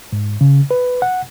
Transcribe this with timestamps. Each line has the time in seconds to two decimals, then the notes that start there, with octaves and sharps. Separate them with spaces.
0.13 G#2
0.41 C#3
0.71 B4
1.02 F#5